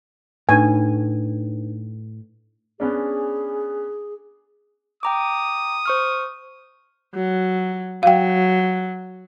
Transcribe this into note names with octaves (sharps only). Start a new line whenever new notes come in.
A2 D4 D#4 B4 G#5
B3 C#4 D4 G#4
G5 A#5 D6 D#6
C5 C#6 F6
F#3
F#3 F5 G5